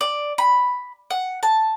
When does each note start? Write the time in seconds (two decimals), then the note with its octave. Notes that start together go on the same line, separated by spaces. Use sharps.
0.01 D5
0.38 B5
1.10 F#5
1.43 A5